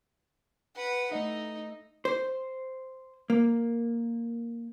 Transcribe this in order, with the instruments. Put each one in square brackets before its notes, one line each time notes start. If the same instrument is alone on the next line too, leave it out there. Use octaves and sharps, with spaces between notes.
[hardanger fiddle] B4 F#5
[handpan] A3 D#5 E5 [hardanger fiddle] D#4
[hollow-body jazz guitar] C5
A#3